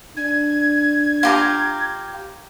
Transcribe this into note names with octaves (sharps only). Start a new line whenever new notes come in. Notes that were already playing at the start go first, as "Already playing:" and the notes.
D4 G#6
F4 G4 A#5